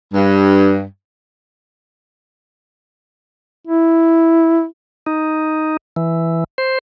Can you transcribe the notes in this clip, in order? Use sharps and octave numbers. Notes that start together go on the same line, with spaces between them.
G2
E4
D#4
E3
C5